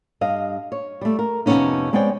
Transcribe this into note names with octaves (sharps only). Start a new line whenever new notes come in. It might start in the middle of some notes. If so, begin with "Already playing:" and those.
G2 D#5 F5
C#5
G3 A3
A#4
F2 C3 F3 B3 C#4 D#4
G#3 B3 C4 C#5 D5 G5